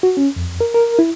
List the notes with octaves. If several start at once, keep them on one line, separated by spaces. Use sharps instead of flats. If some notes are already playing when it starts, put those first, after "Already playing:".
F#4
C#4
F2
A#4
A#4
E4